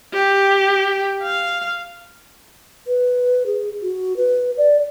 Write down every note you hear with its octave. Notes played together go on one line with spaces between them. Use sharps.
G4
F5
B4
G#4
F#4
B4
D5